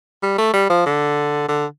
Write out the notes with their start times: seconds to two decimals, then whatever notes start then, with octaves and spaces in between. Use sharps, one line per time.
0.23 G3
0.38 A3
0.53 G3
0.70 F3
0.86 D3
1.49 D3